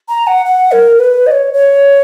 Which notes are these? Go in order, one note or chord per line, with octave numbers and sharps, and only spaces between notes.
A#5
F#5
F#5
A#4
B4
D#5
C#5
C#5